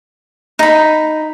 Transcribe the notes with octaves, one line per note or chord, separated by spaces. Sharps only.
D#4 B5